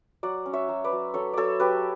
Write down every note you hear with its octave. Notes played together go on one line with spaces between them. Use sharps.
F#3 D5 F#5
C#4
C#5 E5
F#3
B4 D5
F#3
F#3 A4 C#5
F#3 A4 C#5 D5
F#3 G4 B4